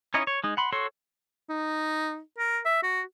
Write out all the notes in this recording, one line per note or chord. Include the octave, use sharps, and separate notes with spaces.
C#4 D#4 E4 C#5 D#5
C#5
G#3 D#4
F#5 B5 C6
F#4 A4 C#5 C6
D#4
A#4
E5
F#4